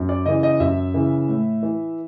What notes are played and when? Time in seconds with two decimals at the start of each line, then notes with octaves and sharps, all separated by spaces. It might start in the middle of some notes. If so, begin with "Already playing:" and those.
Already playing: F#2
0.09 D5
0.26 C#3 E3 D#5
0.43 D#5
0.60 F#2 E5
0.94 C#3 E3
1.28 A2
1.63 E3